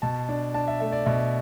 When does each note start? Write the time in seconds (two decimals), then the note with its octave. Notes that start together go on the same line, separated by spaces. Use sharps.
0.02 B2 A5
0.29 D4
0.54 D4 A5
0.68 E5
0.80 A3 E5
0.92 D5
1.06 B2 E5